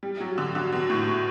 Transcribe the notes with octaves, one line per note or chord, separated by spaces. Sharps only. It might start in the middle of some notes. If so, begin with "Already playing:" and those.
G3
F#3
D3
D3
B2
A2